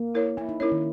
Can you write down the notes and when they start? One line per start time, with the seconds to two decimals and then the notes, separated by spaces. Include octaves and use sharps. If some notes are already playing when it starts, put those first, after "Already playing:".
Already playing: A#3
0.15 E4 A#4 C#5
0.37 A#3 E4
0.49 D#4
0.60 C#4 E4 A#4 C#5
0.72 D#3